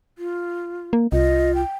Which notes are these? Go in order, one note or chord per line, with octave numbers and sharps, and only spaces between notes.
F4
A#3
C2 F4 D#5
G5